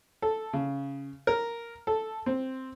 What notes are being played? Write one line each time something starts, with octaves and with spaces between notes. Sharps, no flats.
A4
C#3
A#4
A4
C4